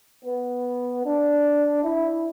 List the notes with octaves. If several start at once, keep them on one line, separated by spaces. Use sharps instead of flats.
B3
D4
E4